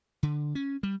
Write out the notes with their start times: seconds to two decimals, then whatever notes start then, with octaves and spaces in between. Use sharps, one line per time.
0.23 D3
0.55 C#4
0.83 G3